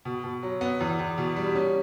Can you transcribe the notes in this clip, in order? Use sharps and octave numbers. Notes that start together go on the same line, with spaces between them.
B2
B2
F#3
B3
E2
E2
B2
G3
C#4